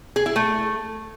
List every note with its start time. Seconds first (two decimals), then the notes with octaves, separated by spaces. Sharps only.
0.16 G#4
0.26 E4
0.36 A3